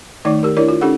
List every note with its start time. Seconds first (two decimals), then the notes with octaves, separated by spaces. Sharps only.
0.25 D#3 A3 D#4 D5 D6
0.43 G4 A#4
0.57 D4 E4 A#4 C#5 D5
0.68 F4
0.81 C#4 D#4 G4 A4 F#5